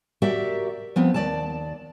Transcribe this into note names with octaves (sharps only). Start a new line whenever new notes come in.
F#4 G4 A#4 D5 E5
F3 B3 C4
D#2 D5 A5